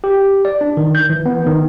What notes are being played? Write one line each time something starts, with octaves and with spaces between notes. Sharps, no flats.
G4
D5
D4
D#3
G6
E3
B3
D#3